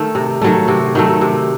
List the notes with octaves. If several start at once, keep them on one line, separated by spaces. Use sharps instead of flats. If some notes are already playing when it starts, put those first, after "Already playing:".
Already playing: D#3 A3
C3
D#3 F#3 A3
C3 F#4
D#3 F#3 A3
C3